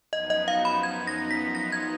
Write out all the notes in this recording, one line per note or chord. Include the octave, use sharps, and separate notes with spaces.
F#2 F3 B3 D#4 D#5
D#5
F5
B5
G#6
A#6
B6
A#6
G#6